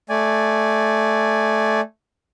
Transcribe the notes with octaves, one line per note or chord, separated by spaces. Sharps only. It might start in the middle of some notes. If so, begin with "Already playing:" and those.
A3 D5 G#5